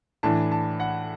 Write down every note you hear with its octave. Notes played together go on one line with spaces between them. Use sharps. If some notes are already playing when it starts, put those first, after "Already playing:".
A2 E3 D4 A5
A5
F#5